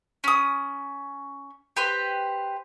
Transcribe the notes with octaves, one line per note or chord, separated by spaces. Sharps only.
C#4 D#6
G4 B4 C5